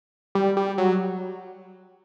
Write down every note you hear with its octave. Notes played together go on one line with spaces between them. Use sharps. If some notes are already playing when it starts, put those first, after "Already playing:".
G3
G3
F#3